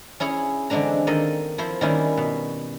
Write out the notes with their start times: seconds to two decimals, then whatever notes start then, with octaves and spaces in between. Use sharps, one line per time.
0.20 C#4 E4 G#4 C#5
0.70 D3 E3 G#3 C4 D4 A#5
1.07 D#3 A#3 A4 D#5 C6
1.58 F3 E4 C5
1.81 D#3 G3 A#3 C#4 E4
2.17 B2